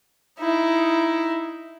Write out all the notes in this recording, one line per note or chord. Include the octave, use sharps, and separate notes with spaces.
D#4 E4